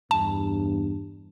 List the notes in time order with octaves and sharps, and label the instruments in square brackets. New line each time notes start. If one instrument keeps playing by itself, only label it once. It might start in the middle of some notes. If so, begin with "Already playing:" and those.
[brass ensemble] E2 G2 [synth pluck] A5